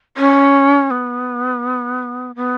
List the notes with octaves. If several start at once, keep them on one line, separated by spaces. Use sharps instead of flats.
C#4
B3
B3